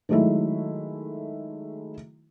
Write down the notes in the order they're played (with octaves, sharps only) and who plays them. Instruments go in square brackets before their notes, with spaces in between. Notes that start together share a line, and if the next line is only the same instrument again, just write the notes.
[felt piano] D#3 F#3 G#3 A3 E4